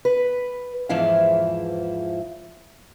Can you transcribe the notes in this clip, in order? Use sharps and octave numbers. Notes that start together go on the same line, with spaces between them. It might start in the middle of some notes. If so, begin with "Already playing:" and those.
B4
E2 G#2 E3 F3 E4 F5